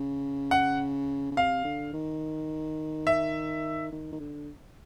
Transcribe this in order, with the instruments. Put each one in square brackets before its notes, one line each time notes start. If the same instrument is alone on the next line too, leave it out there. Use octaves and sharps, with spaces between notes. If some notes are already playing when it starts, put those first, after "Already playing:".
Already playing: [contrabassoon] C#3
[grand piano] F#5
[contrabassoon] C#3
[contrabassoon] C3 [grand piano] F5
[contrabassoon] D3
D#3
[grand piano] E5
[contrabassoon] D#3
D#3
D3